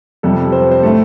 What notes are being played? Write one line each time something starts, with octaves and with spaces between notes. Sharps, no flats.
F2 C3 G3 A4
C5
C5
A2 A3 A4